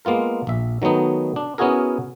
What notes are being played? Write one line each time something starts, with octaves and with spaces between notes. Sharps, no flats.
G#3 A#3 B3 F4 A#4
A#1 E5
D#3 F#3 A3 B3 D#4
D4
B3 C#4 E4 F#4 G#4 A#4